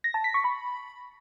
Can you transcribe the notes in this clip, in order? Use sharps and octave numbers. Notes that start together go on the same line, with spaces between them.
A#6
A5
B6
C#6
B5